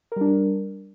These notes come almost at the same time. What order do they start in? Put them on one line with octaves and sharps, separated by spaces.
A#4 G3 D4